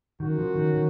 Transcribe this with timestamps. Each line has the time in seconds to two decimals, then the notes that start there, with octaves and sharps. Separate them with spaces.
0.20 D#3 F#3 C#4 F#4 A#4
0.38 F3
0.56 D#3
0.74 D#3